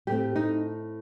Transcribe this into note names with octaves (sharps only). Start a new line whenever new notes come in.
A2 A3 C4 G4
D#4